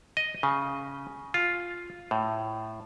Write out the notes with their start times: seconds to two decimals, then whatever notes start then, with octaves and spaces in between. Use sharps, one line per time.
0.17 D#5
0.43 C#3
1.34 F4
2.11 A2